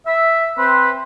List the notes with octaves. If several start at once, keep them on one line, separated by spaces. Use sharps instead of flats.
E5
C4 B4